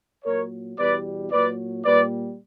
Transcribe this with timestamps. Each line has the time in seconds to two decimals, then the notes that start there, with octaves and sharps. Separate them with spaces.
0.25 A#2 F#3 A#4 C#5
0.78 E2 B2 G3 B4 D5
1.32 A#2 F#3 B4 D5
1.85 A#2 G3 B4 D5